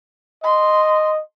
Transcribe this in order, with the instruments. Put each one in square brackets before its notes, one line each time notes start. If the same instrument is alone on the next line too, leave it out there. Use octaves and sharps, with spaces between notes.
[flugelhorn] D#5 [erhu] C6